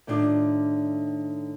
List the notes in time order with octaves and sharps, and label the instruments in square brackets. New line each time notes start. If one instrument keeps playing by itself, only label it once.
[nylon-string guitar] A2 D3 D#3 D4 F4